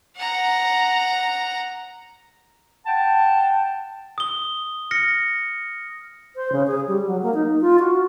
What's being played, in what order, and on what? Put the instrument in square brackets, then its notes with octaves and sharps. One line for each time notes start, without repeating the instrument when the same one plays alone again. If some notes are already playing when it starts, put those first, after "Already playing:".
[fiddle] F#5 A#5
[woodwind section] F#5 G5 A5
[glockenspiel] D#6 G7
F6 A#6 C#7
[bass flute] C5
C#3
G#4
G3
F#3
A#3
D#4
F4
F#4